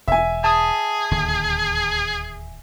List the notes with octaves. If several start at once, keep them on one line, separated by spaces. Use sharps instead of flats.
E1 E5 G#5
G#4 A5 D#6
D1 D#2 D3